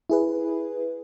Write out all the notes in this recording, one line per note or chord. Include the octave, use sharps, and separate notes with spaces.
E4 G#4 B4